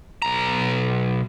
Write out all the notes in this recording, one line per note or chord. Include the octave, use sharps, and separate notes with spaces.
B1 A#5